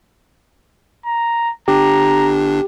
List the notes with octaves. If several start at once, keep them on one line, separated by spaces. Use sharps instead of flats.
A#5
G1 D4 G4 A#5